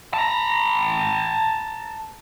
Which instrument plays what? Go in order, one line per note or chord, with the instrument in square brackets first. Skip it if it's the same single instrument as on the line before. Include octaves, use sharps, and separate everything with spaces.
[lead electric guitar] A5 A#5